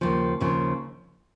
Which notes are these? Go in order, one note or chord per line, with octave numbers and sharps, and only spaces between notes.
D#2 C#3 F3
D#2 C#3 F3